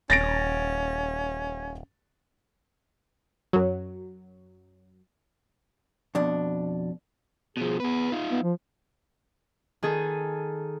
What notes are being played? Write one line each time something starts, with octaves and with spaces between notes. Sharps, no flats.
D#1 C#4 A6 A#6 D7
F#2 F#3
F2 B2 D4
B2 F3 G#4
B3 G#4 B4
D#4 F4
B3
F3
D#3 G#4 A4